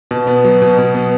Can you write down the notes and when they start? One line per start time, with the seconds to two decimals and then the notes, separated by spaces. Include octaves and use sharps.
0.11 B2
0.27 B3
0.44 F#3
0.62 B2
0.78 B2
0.94 B3